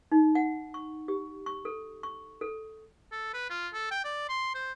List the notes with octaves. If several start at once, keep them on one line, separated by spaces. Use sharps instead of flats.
D#4
F#5
C#6
G4
C#6
A4
C#6
A4
A4
B4
F4
A4
G5
D5
C6
C5